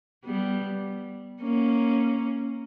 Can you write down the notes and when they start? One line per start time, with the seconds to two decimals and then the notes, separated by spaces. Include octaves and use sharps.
0.25 G3 B3
1.42 A#3 C#4